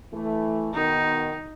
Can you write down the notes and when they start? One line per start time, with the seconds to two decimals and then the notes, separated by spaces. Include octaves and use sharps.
0.13 E3 A3
0.74 B2 D#3 D#4